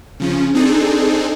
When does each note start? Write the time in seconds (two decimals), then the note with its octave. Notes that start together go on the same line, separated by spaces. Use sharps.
0.20 C#3 F3 C#4
0.55 C4 D4 D#4 G#4 A4